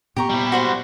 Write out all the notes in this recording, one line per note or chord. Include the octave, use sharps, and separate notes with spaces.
A#2 B3 G4 A#5 C#6
G3 E4
F#4 C5 F#5